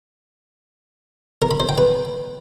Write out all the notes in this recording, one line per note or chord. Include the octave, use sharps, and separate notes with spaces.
A#4
B5
C5
G5
B4